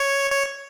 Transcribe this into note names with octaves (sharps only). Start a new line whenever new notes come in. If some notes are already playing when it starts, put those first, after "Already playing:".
Already playing: C#5
C#5